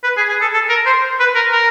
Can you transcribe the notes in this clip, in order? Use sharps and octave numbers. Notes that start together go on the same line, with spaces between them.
B4
G#4
G#4
A4
A4
A#4
C5
B4
A#4
A#4